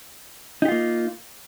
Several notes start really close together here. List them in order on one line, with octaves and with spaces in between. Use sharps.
D#4 G4 F4 A#3